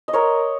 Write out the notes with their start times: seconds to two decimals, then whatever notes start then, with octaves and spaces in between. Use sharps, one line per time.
0.08 D#5
0.13 A#4 C#5